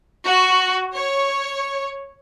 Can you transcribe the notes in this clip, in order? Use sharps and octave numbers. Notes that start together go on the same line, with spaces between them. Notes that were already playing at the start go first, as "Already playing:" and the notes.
F#4
C#5